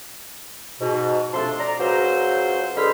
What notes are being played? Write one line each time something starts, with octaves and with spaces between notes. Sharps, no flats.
G#2 B2
C3 F3 A3 D4 A5 C6
D5 A#5
C#2 F#3 F4 C5
D3 G#3 B3 B5 C6 F6